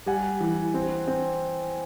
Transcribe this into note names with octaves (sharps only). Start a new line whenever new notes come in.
G3 F#5 G#5
E3
C4
C4